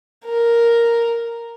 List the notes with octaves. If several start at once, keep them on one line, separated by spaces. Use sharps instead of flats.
A#4